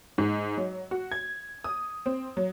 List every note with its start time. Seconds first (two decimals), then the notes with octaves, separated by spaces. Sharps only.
0.18 G#2
0.57 F#3
0.91 F#4
1.12 G#6
1.64 D#6
2.06 C4
2.37 F#3